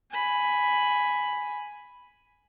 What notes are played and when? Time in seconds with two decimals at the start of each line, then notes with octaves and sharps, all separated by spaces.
0.11 G#5 B5